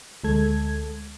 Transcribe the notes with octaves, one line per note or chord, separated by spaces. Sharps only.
D2 G#3 A4 G#6